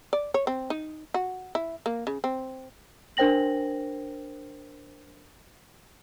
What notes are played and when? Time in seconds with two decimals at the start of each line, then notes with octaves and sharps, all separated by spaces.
0.13 D5
0.34 C#5
0.47 C4
0.70 D#4
1.14 F#4
1.55 E4
1.86 A#3
2.07 C#3
2.24 C4
3.17 D4 A#4 C5 G5 A#6 F#7